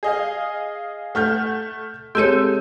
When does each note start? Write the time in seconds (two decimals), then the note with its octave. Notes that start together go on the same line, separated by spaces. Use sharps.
0.03 G#4 D#5 F5
1.15 A3 F#5 F6 G6
2.15 G#3 C4 G4 A4 C#5 E6 G6 D#7